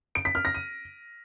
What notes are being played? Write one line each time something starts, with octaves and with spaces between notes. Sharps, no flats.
D7
B6
F6
A#6
D#7